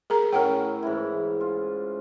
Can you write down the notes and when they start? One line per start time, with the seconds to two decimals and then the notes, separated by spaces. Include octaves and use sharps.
0.10 G#4 A#4 A#5
0.32 A2 C#4 A#4 F#5 G5
0.83 G#2 E3 E4
1.41 F4